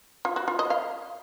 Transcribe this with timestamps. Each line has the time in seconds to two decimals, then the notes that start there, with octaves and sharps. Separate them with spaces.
0.25 F4
0.36 F#4
0.48 F4
0.59 D#5
0.70 F5